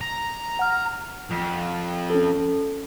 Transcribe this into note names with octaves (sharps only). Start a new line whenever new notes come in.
A#5
F#5 F6
F2
C#4 A4